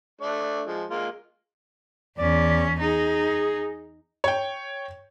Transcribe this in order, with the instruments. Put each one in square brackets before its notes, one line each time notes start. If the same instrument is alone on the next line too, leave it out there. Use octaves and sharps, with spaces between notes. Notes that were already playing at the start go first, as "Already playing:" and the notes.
[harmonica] A3 D4 D5
F3 G#3
G#3 A#3 F4
[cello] E2 C#4 [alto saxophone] D5
[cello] D#4 [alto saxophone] G#4
[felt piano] C#5 G5